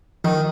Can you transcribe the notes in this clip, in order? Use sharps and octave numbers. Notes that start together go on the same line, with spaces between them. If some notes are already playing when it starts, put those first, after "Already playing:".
D#3 F3